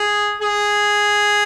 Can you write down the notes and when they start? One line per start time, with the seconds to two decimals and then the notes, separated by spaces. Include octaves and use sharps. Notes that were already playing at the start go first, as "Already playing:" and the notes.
Already playing: G#4
0.41 G#4